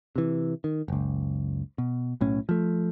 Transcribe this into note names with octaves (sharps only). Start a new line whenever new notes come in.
C3 E3
D#3
F#1 C#2
B2
B1 A2 C#4
F3 A3